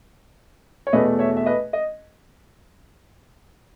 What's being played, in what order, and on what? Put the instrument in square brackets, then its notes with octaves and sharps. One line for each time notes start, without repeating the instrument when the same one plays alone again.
[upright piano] C#5
E2 B2 A3 B4 D#5
C#5 E5
E5
B4 D#5
D#5